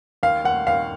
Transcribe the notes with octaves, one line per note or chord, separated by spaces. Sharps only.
D#2 F5
D#2 F#5
D#2 F5